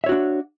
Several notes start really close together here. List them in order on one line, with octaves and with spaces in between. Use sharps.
E5 C#5 F#4 D4